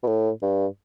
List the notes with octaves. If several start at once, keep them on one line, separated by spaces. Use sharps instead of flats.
B2
A2
G2